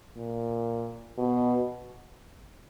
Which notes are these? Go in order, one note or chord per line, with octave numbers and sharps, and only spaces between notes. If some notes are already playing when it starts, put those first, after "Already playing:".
A#2
B2